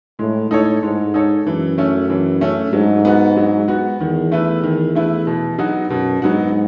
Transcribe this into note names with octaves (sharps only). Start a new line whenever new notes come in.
A2 G#3
A2 D#4 A4 C#5
G#2 G#3
D#4 A4 C#5
F#2 E3
A3 C#4
E3
A3 C#4
G#2 F#3
B3 F#4
F#3
B3 F#4
E2 D#3
A3 E4 B4
D#3
A3 E4 B4
B2
F#3 B3 D#4 F#4
F#2 B2
G#2 F#3 B3 D#4 F#4